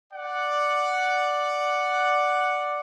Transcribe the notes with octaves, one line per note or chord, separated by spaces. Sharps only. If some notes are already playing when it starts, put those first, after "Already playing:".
D5 F#5